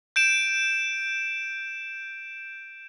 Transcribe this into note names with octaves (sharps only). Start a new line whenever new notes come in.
G6 D7 E7